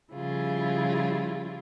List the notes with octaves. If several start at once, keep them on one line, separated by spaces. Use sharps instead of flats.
C#3 F3 G3 E4 F4 G#4